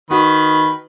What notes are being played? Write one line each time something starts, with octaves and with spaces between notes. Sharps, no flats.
D#3 F#4 B4